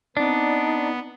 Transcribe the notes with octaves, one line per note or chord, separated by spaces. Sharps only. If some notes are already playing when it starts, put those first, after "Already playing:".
B3 C4 D4 D#4 D5